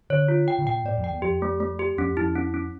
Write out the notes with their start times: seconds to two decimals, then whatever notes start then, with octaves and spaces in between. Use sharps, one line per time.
0.10 D3 C#5
0.28 F4
0.48 G5
0.59 C#3
0.66 A#2 G5
0.85 A2 D5
0.97 F2
1.04 G5
1.10 E2
1.22 F2 G4
1.42 A3
1.60 A3
1.79 G4
1.98 F2 C#4
2.17 F2 E4
2.36 C#4
2.54 C#4